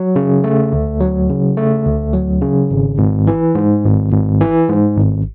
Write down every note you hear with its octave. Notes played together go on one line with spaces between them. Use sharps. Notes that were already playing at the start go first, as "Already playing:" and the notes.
Already playing: F#3
C#3
A3
D2
F#3
C#3
A3
D2
F#3
C#3
G#1
G#1
E3
G#2
G#1
G#1
E3
G#2
G#1